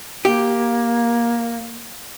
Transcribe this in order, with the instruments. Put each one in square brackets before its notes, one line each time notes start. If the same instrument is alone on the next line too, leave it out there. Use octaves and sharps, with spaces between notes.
[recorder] A#3 [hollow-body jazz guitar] G4